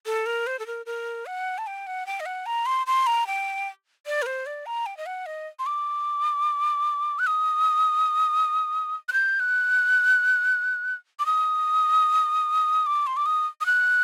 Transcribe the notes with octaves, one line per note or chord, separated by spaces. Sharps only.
A4
A#4
C5
A4
A#4
A#4
F#5
A5
G5
F#5
G5
D#5
F#5
A#5
C6
C6
A#5
G5
D5
A#4
C5
D5
A#5
G5
D#5
F#5
D#5
C6
D6
F#6
D#6
F#6
G6
F#6
D6
D#6
D6
C6
D6
D#6
D#6
F#6